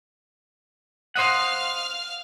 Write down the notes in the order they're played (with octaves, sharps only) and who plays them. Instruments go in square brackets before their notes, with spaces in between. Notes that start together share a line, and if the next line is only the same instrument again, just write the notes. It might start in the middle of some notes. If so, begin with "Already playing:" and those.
[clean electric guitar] C5 D#5 F#5 [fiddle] F5 F6